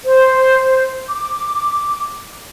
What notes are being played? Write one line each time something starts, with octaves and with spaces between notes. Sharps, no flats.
C5
D6